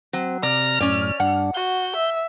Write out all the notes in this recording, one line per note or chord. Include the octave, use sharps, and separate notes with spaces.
F#3 C4
C3 D5 A#5 F6 A#6
F#2 A2 C#4 D5
G2 D4 F#5
F#4 G6
E5